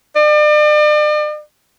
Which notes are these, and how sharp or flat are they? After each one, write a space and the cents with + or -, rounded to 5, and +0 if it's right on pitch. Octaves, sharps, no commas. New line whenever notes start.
D5 +40